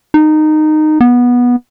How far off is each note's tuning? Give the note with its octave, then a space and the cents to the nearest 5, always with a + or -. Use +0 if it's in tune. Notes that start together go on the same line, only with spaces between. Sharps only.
D#4 -15
B3 -15